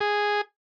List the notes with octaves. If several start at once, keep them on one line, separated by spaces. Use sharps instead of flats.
G#4